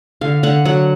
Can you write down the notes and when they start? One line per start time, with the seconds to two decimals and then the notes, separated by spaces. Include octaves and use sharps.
0.21 D3 F5
0.43 D3 F#5
0.65 F#3 F#5